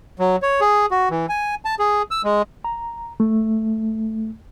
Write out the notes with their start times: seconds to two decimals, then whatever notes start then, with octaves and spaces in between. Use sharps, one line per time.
0.19 F#3
0.42 C#5
0.61 G#4
0.91 F#4
1.10 E3
1.29 G#5
1.65 A5
1.79 G#4
2.11 E6
2.24 G#3
2.64 A#5
3.20 A3